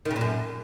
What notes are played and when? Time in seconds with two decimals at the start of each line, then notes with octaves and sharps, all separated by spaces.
0.05 D#3
0.11 C#3
0.16 A#2
0.21 F#2